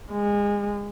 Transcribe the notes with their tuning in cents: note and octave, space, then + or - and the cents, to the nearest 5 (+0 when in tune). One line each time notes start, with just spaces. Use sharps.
G#3 -25